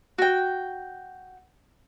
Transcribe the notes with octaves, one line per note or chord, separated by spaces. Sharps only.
F#4 G5